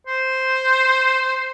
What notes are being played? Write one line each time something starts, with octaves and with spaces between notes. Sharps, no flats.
C5